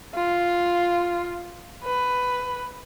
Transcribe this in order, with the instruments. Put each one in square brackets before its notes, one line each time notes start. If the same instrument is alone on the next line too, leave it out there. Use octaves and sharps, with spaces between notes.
[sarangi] F4
B4